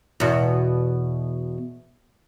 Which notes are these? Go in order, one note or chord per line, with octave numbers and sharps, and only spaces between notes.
E2 B2